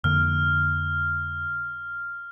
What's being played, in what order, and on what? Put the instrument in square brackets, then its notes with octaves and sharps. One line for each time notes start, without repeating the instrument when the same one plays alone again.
[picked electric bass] F2 D3 A#3 [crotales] F6